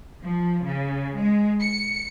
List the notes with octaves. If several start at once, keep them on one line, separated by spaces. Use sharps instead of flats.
F3
C#3
G#3
C#7